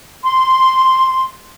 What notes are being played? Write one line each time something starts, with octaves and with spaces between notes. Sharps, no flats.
C6